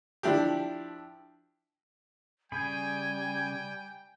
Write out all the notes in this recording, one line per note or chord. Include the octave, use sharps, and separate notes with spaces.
F3 D4 E4 G4
C#3 G3 G#4 G5 G#5 B5